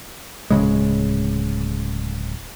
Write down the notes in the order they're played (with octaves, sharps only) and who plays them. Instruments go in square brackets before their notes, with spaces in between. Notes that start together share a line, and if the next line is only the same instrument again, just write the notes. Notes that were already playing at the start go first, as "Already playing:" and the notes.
[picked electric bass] D1 B1 C#3 G#3